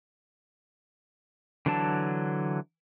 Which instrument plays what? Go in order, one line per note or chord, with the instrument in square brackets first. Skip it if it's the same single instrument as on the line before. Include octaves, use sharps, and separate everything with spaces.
[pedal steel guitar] D3 E3 F#3 D4 A5